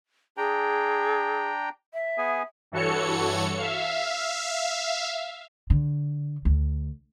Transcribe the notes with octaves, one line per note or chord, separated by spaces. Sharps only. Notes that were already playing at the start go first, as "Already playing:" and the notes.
D4 G#4 G5 A#5
E5
B3 G#4 G#5
G2 E3 F#4 A4 C#5 C#7
E5 F5
D3
D2